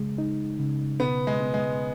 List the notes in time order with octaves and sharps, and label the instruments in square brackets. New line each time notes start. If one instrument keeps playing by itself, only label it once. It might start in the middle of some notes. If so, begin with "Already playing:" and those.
Already playing: [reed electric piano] C#3 G#3
D#4
C#3
[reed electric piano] B2 [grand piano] B3
[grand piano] G#3
[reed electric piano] B3
[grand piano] G#3